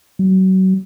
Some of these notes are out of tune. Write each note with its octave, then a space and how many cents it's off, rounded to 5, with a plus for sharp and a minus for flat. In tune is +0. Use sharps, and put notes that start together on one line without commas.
F#3 +30